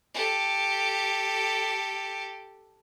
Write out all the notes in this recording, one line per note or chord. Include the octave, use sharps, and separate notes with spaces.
G4 A4